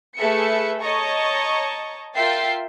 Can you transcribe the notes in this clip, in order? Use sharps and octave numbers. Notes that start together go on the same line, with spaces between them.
A3 G#4 A4 B4 E5 C#7
C#5 D#5 A5 A#5 C#6
F4 A#4 E5 G5 A6 C7